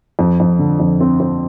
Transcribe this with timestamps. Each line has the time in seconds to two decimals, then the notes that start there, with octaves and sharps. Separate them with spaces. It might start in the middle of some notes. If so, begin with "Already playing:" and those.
0.19 F2
0.40 F2
0.59 D3
0.80 F2
1.00 C4
1.20 C4